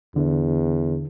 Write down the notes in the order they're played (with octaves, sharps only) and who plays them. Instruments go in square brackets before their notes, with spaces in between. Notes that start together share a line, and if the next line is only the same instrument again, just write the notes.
[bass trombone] E2 [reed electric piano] D3